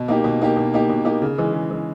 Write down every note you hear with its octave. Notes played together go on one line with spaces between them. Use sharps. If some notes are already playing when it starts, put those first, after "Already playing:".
Already playing: B2
A#3 D#4 G4
B2
A#3 D#4 G4
B2
A#3 D#4 G4
B2
A#3 D#4 G4
C#3
E3 G#3
C#3
E3 G#3